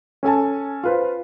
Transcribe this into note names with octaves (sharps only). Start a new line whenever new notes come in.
C#4 A4 G#5 A5
F4 B4 C5